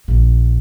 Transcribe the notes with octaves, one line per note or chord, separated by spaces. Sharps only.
A#1